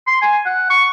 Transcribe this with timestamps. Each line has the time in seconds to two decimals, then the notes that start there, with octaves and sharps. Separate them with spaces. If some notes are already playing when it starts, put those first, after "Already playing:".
0.07 C6
0.22 G#5
0.46 F#5
0.70 C#6